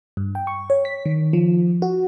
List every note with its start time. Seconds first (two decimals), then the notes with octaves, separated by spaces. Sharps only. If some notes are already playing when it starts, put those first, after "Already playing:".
0.17 G2
0.35 G5
0.47 C#6
0.70 C#5
0.85 B6
1.06 D#3
1.33 F3
1.82 F#4